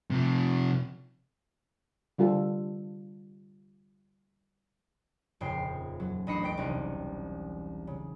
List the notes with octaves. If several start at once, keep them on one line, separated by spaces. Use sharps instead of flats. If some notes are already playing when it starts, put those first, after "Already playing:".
C3 F3
D3 G3 F4 A4
D#1 F2 C#3 G5 C7
F#3
A1 D4 D#5 B5 C7 C#7
D#2 C5 G5 B6 D7
E1 C2 C#4 D#4
C#3